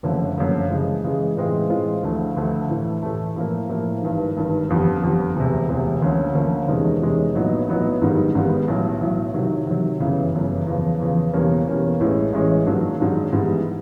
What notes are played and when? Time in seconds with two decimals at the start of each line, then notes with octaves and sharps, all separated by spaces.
0.03 F#1 F#2 D3 F3 A3
0.37 F#1 F#2 D3 F3 A3
0.70 C#3 E3 G#3
1.04 C#3 E3 G#3
1.37 A2 E3 G#3 C4 F4
1.70 A2 E3 G#3 C4 F4
2.03 D2 D3 F3 A3
2.37 D2 D3 F3 A3
2.69 A2 E3 A3
3.02 A2 E3 A3
3.36 A2 F3 A#3
3.69 A2 F3 A#3
4.02 G#1 G2 D#3
4.36 G#1 G2 D#3
4.69 G1 F2 D3 G3
5.01 G1 F2 D3 G3
5.36 E1 D2 C3
5.69 E1 D2 C3
6.02 D2 D3 F3 A#3 C#4
6.35 D2 D3 F3 A#3 C#4
6.68 E2 C3 D#3 G#3 C#4
7.01 E2 C3 D#3 G#3 C#4
7.35 A#1 A2 F#3 B3 D#4
7.68 A#1 A2 F#3 B3 D#4
8.01 G#1 G#2 D#3 G3 B3
8.34 G#1 G#2 D#3 G3 B3
8.68 B1 A2 F#3
9.01 B1 A2 F#3
9.34 C3 D#3 F#3
9.67 C3 D#3 F#3
10.00 G1 F#2 C#3 E3
10.34 G1 F#2 C#3 E3
10.67 E2 C#3 F3
11.00 E2 C#3 F3
11.33 E2 B2 G3 A#3 C#4
11.67 E2 B2 G3 A#3 C#4
12.00 A1 A2 E3 G#3 C#4
12.33 A1 A2 E3 G#3 C#4
12.66 G#2 D#3 F#3 A#3 D4
13.00 G#2 D#3 F#3 A#3 D4
13.33 G#2 E3 G3 B3